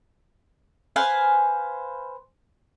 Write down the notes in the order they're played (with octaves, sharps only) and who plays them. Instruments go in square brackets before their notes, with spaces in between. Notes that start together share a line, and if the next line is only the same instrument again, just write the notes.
[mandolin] B4 C5 F5 G#5